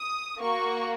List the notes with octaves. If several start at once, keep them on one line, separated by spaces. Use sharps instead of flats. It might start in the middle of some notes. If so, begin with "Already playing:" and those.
Already playing: D#6
A#3 F#4 C#6